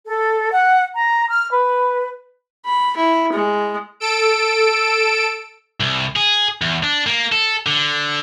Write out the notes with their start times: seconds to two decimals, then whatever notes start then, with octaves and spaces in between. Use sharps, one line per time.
0.06 A4
0.53 F#5
0.96 A#5
1.30 F6
1.51 B4
2.65 B5
2.97 E4
3.33 G#3
4.00 A4 E6 D7
5.80 C2
6.16 G#4
6.62 E2
6.83 D4
7.07 A#3
7.32 A4
7.67 D3